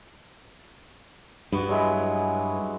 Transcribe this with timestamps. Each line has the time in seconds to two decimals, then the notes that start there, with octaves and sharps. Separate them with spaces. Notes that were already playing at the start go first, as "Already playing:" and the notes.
1.52 G2 B3 F#4
1.69 F#3 G#3 E4